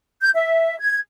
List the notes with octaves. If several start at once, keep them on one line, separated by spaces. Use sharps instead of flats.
G6
E5
G#6